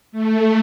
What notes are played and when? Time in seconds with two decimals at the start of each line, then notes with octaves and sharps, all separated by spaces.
0.12 A3